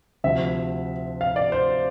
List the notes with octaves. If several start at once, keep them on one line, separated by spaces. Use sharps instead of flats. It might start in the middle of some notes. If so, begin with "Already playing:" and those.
D2 C3 F3 E5
F5
D5
C5